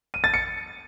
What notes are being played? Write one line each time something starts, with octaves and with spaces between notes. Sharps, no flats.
D#7
A6
C#7